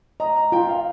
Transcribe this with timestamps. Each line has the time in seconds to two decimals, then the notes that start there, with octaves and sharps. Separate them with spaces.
0.20 D#5 A#5
0.36 A#5
0.52 F4 G5
0.69 F5